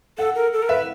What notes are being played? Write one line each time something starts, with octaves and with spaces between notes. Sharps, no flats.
A4 F#5
A#4
A4
A#4
B4 E5